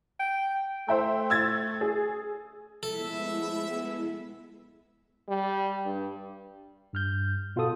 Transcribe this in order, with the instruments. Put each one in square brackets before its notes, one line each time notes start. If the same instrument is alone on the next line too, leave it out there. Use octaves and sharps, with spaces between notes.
[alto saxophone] G5
[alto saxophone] A3 [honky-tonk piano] C5 E5 G5
[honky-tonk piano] E6 G#6 A6
G#4
[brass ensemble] F3 A3 E5 [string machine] G#3 B3 E4 [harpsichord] A4
[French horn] G3
G2
[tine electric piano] G2 F6 G6
B2 F4 F#4 A4 D#6